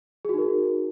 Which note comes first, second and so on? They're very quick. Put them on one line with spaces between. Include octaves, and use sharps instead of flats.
G#4 F#4 D#4 A#4